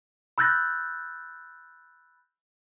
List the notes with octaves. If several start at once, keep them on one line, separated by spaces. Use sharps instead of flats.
B5 E6 F#6 G6 A6 A#6